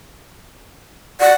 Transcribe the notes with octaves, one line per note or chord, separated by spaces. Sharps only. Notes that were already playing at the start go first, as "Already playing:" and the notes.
D5 F#5